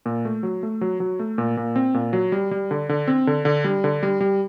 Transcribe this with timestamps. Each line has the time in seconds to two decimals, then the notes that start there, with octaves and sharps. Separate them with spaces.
0.06 A#2
0.25 A3
0.43 F#3
0.63 A3
0.81 F#3
1.00 F#3
1.19 A3
1.38 A#2
1.57 A#2
1.76 C4
1.94 A#2
2.13 F#3
2.32 G3
2.51 G3
2.71 D3
2.89 D3
3.08 C4
3.27 D3
3.45 D3
3.64 G3
3.84 D3
4.03 G3
4.20 G3